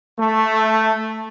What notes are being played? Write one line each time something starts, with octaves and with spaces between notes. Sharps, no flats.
A3